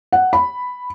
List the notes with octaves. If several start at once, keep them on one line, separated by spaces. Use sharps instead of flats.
F#5
B5